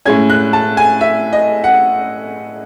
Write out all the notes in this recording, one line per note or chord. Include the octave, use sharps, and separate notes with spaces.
A2 G#3 C#4 G#6
F#6
A5
G#5
E5
D#5
F#5